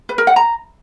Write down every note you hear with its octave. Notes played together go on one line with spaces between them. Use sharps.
B4
A#4
F#5
A#5